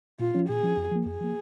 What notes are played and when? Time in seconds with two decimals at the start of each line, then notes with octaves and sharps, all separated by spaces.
0.19 A#2 F4
0.35 F3 C#4
0.48 A#2 G#4
0.63 F3 C#4
0.77 F2
0.92 F3 A#3
1.06 F2 G#4
1.20 F3 A#3